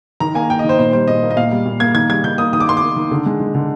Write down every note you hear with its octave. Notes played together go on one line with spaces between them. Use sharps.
D#3 A#5
A#3 G#5
A#3 G5
D#5
D#3 C5
A#2 C5
G3 C5
A#2 D#5
A#3
D#5
A#2 F5
G3
A#2
A#3 G#6
D#3 G#6
G3 G#6
D#3 G6
A#3 D#6
D#3 D#6
D6
A#3 C6
D6
A#3
D#3
D3
G#3
G#3
D3